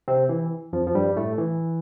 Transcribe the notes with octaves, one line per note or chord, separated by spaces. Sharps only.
C3 C4
E3
F2 F3
F3
G2 G3
A2 A3
E3